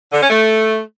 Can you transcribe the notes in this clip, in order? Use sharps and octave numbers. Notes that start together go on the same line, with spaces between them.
D3
C#4
A3